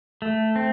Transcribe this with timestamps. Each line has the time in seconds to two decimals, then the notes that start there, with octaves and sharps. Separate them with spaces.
0.22 A3
0.56 C4